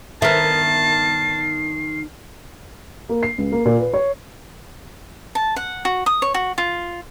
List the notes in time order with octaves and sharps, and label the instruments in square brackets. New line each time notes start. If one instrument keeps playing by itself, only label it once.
[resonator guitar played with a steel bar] G2 A#4 E5 [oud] D#3 B3 [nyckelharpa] A5 [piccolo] C7
[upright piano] A#3
C7
C#2
A#3
A#2
B4
C#5
[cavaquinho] A5
F#5
F#4
D#6
C#5
F#4
F4